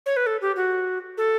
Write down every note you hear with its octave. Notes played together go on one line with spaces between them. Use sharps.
C#5
B4
A4
G4
F#4
A4